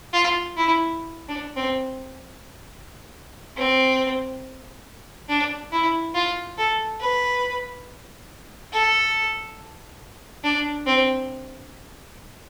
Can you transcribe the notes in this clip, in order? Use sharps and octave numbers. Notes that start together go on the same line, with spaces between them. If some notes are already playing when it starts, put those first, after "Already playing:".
F4
E4
D4
C4
C4
D4
E4
F4
A4
B4
A4
D4
C4